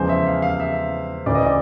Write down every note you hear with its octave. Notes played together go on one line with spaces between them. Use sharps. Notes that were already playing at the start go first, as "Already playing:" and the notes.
Already playing: E2 C#3 F3 G#3 C5
E5
F5
F5
E5
D2 C#3 E3 D5
D#5
D5